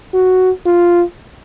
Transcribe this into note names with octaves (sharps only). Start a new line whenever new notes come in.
F#4
F4